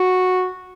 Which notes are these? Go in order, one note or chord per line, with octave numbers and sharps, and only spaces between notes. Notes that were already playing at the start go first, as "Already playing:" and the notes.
Already playing: F#4